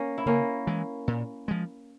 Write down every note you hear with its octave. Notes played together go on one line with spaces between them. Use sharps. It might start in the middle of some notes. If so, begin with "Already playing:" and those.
Already playing: A#3 C#4
E4
C#3 A#3 C#4
E3 G#3
A#2
F3 G#3